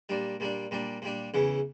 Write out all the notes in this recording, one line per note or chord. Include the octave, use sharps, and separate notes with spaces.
A#2 G3 D4
A#2 G3 D4
A#2 G3 D4
A#2 G3 D4
E2 C#3 E3